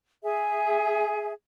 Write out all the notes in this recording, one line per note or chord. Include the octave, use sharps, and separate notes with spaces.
G#4 E5